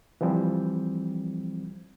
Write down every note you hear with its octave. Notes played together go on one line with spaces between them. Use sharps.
E3 F3 G3 C4